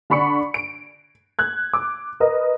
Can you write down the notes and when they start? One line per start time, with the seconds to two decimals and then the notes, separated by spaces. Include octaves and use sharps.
0.10 D3 D4 B5 C#6 C#7
0.54 D7
1.39 F#6 G#6
1.74 D6
2.20 A#4 B4 D#5